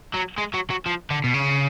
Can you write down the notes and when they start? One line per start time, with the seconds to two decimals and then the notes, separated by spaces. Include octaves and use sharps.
0.14 F#3
0.38 G#3
0.54 F#3
0.70 F#3
0.86 F3
1.10 D3
1.24 B2
1.34 C#3